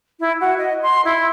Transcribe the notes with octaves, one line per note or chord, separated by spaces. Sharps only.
E4
F#4
D#5
C6
E4